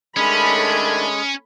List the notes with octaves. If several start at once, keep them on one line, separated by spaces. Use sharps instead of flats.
D#3 G#3 A3 C#4 D4 A4 B5 D#6